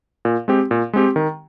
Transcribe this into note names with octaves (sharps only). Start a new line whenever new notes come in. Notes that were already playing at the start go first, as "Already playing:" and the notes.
A#2
G#3 C4 G4
A#2
G#3 C4 G4
D#3